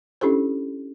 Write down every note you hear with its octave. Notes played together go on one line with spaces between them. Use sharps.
C#4 D4 E4 G4 A4 C5